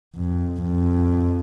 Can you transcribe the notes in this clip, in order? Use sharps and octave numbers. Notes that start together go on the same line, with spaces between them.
F2
F2